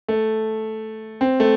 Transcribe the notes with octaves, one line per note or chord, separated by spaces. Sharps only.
A3
C4
A3